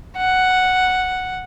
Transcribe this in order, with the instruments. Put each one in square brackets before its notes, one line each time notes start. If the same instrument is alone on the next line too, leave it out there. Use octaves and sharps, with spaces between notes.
[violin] F#5